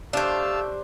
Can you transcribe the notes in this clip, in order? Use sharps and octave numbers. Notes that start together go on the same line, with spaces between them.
A3 D4 G4 C5 F5 A5 E6